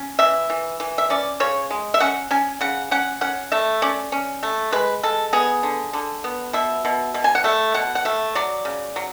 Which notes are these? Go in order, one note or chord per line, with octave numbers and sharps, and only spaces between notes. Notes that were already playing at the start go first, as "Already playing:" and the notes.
Already playing: C#4
E3 E5
E3
E3
E5
C#4 D5
C#3 C#5
G#3
E5
C#4 F#5
C#4 G#5
C#3 F#5
C#4 F#5
C#4 F#5
A3 E5
C#4 D5
C#4
A3
G#3 B4
G#3 A4
B3 G#4
D3
D3
B3
B2 E5
B2
B2
G#5
F#5
A3 E5
B2 F#5
F#5
A3 E5
F#3 D5
C#3
F#3